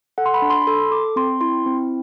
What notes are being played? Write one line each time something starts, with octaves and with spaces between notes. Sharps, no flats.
A4 F#5
C6
B5
D4
C6
B5
A4 C6
A4 D6
C4 C6
E4 C6
C4